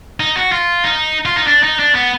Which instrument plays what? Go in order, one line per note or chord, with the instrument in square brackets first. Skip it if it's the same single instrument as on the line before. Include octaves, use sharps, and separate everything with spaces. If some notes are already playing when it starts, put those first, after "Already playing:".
[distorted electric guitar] D#4
F#4
F4
D#4
F4
D#4
D4
D#4
D4
B3